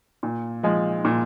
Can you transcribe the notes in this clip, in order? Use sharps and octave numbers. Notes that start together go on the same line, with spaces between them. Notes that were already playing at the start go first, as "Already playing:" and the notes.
A#2
F3 G#3
A#2